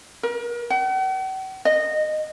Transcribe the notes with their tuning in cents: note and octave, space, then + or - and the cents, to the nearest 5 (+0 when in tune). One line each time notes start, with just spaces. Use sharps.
A#4 +40
F#5 +45
D#5 -15